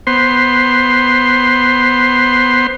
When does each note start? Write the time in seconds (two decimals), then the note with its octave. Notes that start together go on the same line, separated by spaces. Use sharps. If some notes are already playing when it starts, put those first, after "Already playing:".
0.07 B3 C5 C6